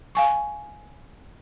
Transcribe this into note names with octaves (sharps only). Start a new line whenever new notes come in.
F5 G#5 C#6